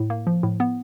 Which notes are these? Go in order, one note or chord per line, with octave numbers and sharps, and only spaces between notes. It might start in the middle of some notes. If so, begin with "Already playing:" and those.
Already playing: A2
A#3
F3
A2
B3